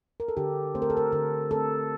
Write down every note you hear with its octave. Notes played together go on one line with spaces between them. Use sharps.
A#4
A4
D3 G4
A3 C4 C5
A#4
A4
A#4
D3 A#4
A3 C4 A4